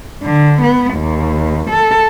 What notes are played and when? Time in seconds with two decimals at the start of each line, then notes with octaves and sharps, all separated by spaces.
0.23 D3
0.61 B3
0.95 D#2
1.70 A4